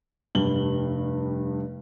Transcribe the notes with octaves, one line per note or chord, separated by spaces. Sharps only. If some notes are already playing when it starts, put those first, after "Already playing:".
F1 G2 G3 D4 F#7 G7